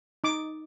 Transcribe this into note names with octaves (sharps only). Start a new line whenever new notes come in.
D#4 D6